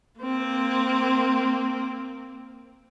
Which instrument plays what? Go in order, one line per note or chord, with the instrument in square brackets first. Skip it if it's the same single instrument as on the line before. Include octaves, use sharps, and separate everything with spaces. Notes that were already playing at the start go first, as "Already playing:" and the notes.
[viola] A#3 C4